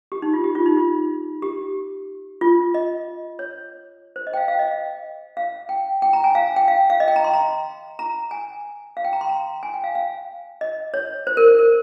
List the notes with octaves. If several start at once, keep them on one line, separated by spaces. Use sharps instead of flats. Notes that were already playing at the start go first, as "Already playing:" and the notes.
G4
D#4
F4
G4
F4
D#4
F4
G4
F4
D#5
C#5
C5
D#5
G5
F5
F5
D#5
F5
F5
G5
G5
A#5
G#5
F5
G5
F5
F5
D#5
G5
A#5
C6
A#5
A#5
G#5
F5
G5
A#5
C6
A#5
G#5
G5
F5
F5
D#5
C#5
C5
A#4
A#4
A#4